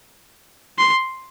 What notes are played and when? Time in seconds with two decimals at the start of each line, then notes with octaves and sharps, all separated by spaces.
0.79 C6